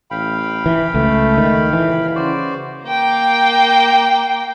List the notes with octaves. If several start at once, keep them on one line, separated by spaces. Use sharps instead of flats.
A1 F5 G5 B5
E3
C#2 A3
D#3
D#1 E3
C#3 F#4 C5 D5
A#3 G5